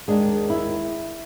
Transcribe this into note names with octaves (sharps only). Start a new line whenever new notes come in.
D#2 D#3 G#3 D4
E4